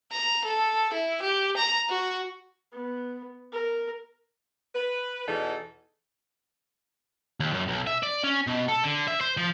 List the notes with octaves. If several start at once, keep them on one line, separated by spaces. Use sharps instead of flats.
A#5
A4
E4
G4
A#5
F#4
B3
A#4
B4
E2 B2 E3 D#4 G#4 A4
D#2
F#2
B1
E5
D5
C#4
B2
A4
D3
E5
C5
F3